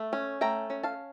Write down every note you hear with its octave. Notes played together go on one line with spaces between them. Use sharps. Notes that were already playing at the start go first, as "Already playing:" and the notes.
Already playing: A3
C#4
A3 G5 A#5
C#4
F5 A5